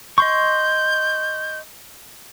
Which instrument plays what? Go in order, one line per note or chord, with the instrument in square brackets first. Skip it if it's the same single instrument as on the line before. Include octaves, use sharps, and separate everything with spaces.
[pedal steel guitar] D#5 C6 C#6 [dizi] G6